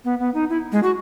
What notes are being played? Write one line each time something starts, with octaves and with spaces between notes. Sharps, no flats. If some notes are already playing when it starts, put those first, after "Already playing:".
B3
B3
D#4
E4
G#3
F#4